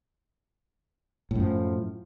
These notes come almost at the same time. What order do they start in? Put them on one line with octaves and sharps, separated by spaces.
A2 F#2 F3